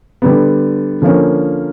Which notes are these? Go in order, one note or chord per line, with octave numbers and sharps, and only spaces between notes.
D3 G3 B3
D3 F3 A#3 C#4